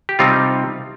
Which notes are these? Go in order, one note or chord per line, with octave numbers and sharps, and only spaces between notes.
G4
C3 G3 C4 D#4 F4